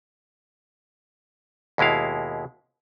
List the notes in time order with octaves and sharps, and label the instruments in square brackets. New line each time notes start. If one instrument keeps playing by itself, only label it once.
[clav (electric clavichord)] D#2 B2 G#3 E4 F5